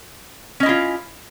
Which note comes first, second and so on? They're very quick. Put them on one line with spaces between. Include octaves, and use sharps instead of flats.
C#4 D#5 E4 F4